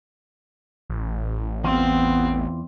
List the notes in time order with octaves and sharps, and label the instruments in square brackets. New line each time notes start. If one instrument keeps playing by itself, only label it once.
[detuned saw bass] A1
[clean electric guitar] E2 E3 F4 [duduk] B3 [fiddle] C4